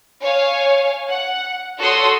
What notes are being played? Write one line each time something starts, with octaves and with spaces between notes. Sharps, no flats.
C#5 F5 G#5
F#5
F#4 A4 C#5 C6 D#6 E6